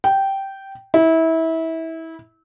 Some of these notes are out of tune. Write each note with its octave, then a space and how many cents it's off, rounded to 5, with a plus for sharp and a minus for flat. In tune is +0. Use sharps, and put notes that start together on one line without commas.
G5 -10
E4 -25